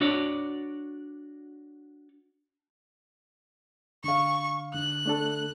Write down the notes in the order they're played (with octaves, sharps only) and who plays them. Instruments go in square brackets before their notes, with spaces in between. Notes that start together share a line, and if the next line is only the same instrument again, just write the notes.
[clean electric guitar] D4 F#4 C#5 D5
[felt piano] D3 F5 [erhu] C#6
[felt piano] D3 [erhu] F#6
[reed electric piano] A3 D4 A4